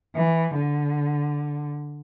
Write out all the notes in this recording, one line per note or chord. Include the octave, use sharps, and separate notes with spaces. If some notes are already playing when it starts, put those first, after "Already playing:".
E3
D3